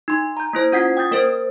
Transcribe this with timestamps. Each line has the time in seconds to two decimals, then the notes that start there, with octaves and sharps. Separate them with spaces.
0.08 D#4 C6
0.37 A#5 G6
0.53 A#3 E4 C5
0.72 C#4 F4 F#5 G#6 B6 C7
0.97 G5 D#6 G6 A6
1.11 A#3 A#4 C5 A6 D7